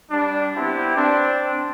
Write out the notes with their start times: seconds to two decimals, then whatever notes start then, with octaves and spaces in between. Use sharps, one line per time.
0.10 G3 D4
0.55 B3 C4 E4 G4
0.95 C4 D4